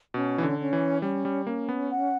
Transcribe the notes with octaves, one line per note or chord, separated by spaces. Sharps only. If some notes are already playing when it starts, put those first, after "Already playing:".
B2 C#4
E3
D3
C#4
E3
G3 C#4
G3
A#3 C#4
B3
F#5